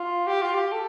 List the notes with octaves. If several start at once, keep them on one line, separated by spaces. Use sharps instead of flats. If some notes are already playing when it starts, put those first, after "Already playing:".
Already playing: F4
G4
F4
G4
A4